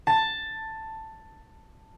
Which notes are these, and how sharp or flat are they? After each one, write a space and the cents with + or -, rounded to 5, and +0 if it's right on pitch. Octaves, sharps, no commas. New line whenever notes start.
A5 +10